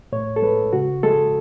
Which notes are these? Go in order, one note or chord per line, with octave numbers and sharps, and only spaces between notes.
A2 C#5
A4
G#3 B4
C#3 F#4
G#3 A4